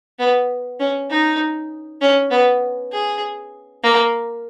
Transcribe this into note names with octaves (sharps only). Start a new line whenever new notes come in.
B3
C#4
D#4
C#4
B3
G#4
A#3